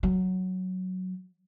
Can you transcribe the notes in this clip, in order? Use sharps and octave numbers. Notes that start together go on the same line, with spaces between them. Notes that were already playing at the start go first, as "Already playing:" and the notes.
F#3